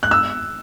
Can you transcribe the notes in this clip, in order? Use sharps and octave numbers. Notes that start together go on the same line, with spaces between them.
F#6
E6